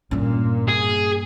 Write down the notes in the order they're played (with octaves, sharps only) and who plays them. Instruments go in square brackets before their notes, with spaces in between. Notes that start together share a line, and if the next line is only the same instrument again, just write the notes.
[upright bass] G2 C#4 [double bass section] A#2
[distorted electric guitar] G#4